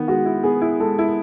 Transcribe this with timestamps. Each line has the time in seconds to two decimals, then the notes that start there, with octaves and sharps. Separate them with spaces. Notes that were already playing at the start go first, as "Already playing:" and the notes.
Already playing: D#3 B3
0.08 G#3 F#4
0.25 E4
0.43 B3 G#4
0.61 E4
0.80 G#3 A4
0.98 E4